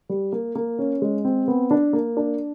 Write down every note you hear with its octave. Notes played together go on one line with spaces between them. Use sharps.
G3
A#3
A#3
C#4
G#3
C4
B3
D4
A#3
D4